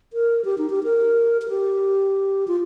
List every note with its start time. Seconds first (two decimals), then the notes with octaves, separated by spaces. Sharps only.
0.13 A#4
0.45 G4
0.58 D#4
0.70 G4
0.84 A#4
1.42 A#4
1.49 G4
2.48 F4